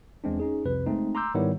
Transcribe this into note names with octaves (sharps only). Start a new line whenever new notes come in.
E2 G#3 C4 D4
C#4 D#4 G#4
C2 F2 C3 B4
G#3 A3 C4 D#4
A#5 C6 D6 E6 G6
G#2 D#3 G3 B3 E4 C#5